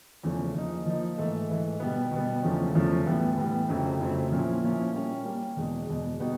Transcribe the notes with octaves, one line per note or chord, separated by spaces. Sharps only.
E2 C#3 F3 A3 C#4
F3 A#3 D#4
F3 A#3 D#4
G#2 E3 A3
G#2 E3 A3
B2 G3 B3
B2 G3 B3
E2 C#3 F3 A3 C#4
E2 C#3 F3 A3 C#4
A2 E3 G3 B3
A2 E3 G3 B3
F2 C#3 F#3 A3 C4
F2 C#3 F#3 A3 C4
A#2 F3 A#3 C#4 E4
A#2 F3 A#3 C#4 E4
G3 A#3 C#4
G3 A#3 C#4
E2 B2 G#3
E2 B2 G#3
B2 G3 B3 D#4 F#4